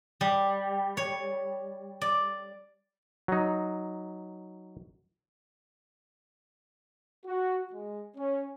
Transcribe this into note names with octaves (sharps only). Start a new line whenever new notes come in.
G3
C#5
D5
F#3 D#4
F#4
G#3
C#4